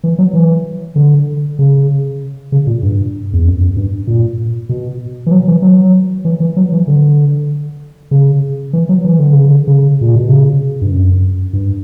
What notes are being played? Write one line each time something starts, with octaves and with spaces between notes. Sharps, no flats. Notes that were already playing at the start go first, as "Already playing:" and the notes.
E3
F#3
E3
D3
C#3
C#3
A#2
G2
E2
F#2
F#2
G2
A#2
B2
E3
F#3
E3
F#3
E3
E3
F#3
E3
D3
C#3
E3
F#3
E3
D3
C#3
D3
C#3
A#2
B2
C#3
G2
F#2
G2